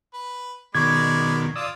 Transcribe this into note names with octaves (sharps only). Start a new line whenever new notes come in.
B4
B2 D#3 G#3 D5 B5 C#6 G#6
F4 D5 D#6 E6